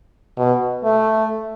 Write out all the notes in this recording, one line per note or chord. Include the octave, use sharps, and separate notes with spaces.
B2
A3